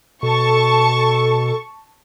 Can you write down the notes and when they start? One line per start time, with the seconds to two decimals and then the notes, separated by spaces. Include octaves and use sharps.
0.23 B2 A4 A5 C#6